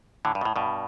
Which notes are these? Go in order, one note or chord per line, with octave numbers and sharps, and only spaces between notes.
A2 D3
G2
B2
A2
G2 B2